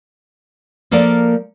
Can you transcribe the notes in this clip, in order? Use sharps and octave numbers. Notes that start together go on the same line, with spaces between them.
F3 A#3 A4 A#4 D5